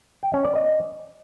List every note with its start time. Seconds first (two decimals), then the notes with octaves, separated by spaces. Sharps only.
0.23 G5
0.34 C#4
0.45 D5
0.55 D#5